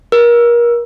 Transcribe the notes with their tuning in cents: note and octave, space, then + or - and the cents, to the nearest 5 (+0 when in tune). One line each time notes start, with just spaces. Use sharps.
A#4 +30